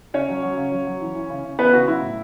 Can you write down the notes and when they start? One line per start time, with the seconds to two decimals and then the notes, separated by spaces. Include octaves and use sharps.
0.14 C#3 C#4 C#5
0.29 F#3
0.43 F#3
0.57 C#3
0.72 F#3
0.87 F#3
1.01 E3
1.15 E3
1.30 C#3
1.44 C#3
1.59 E3 B3 B4
1.73 C#3 F#4
1.88 F#3 E4
2.02 A2